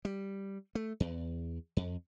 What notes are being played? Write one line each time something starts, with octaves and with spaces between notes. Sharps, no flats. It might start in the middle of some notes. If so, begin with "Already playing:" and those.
G3
A3
E2
F2